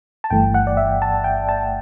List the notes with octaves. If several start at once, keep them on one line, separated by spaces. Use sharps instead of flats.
A5
G1 G2 E3 A3 G5
F#5
D5
E5
A5
G5
A5